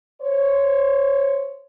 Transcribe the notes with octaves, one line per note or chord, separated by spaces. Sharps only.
C5 C#5